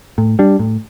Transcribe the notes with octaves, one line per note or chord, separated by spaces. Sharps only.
A2
G3 D4
A2